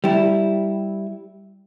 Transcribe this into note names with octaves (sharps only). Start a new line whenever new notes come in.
G3 E4